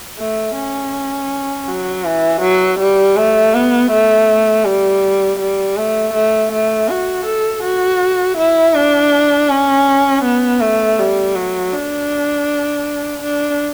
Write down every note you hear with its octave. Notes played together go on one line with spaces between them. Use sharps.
A3
C#4
F#3
E3
F#3
G3
A3
B3
A3
G3
G3
A3
A3
A3
F#4
A4
F#4
E4
D4
C#4
B3
A3
G3
F#3
D4
D4